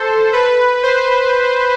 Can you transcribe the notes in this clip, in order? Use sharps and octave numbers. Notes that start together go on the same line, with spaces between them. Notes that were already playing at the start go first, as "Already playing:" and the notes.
Already playing: A4 C5
B4
C5